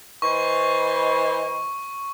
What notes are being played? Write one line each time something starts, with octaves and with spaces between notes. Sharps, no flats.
E3 C5 D#5 C#6